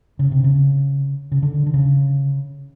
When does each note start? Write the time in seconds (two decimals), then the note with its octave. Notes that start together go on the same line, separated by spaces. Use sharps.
0.19 C#3
0.32 C3
0.44 C#3
1.32 C#3
1.43 D3
1.66 D3
1.74 C#3